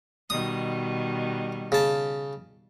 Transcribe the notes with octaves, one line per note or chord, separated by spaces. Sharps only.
B2 D#3 G3 D#6
C#3 A5